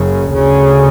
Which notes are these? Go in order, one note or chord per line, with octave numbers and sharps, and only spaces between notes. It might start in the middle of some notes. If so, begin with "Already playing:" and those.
Already playing: F#1 F#2 C#3
D2 C#3